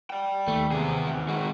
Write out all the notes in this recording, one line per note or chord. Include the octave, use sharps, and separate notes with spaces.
D5 G5
D#2 A3
C3 B3 G#4
D#3 C4
G#3 F#4